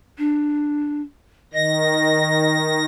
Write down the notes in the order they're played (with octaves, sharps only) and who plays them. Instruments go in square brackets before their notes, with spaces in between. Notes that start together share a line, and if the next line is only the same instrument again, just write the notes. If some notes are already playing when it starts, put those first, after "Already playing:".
[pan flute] D4
[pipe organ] D#3 A#6 [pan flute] D#5